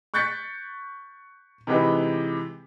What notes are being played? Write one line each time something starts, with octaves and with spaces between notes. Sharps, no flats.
C#6 F#6 G6 A6 B6 C#7
C3 E3 G#3 D#4 G4 B4